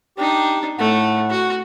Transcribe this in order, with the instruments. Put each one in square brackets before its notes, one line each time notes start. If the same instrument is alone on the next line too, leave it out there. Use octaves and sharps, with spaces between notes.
[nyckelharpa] D4 D#4 [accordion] G4
[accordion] A2 F#5 [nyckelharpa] A3
[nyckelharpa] F#4